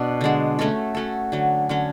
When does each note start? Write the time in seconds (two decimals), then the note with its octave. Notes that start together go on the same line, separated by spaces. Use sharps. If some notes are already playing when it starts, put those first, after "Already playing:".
Already playing: B2 D4
0.21 D3 G#3 D4
0.59 A3 C#4 F#4 A4
0.95 A3 C#4 F#4 A4
1.32 D3 F#3 C#4
1.69 D3 F#3 C#4